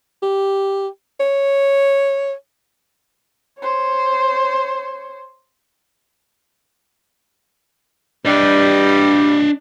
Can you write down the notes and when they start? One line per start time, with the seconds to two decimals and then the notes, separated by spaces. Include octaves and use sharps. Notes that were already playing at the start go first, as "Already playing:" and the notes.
0.23 G4
1.20 C#5
3.59 C5 C#5
8.26 G2 G3 D4 D#5